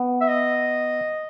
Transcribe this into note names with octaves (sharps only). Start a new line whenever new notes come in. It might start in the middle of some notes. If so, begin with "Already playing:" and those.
Already playing: B3
E5
D#5